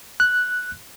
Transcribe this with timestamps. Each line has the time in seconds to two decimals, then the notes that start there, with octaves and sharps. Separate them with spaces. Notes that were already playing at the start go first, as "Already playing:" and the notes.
0.20 F#6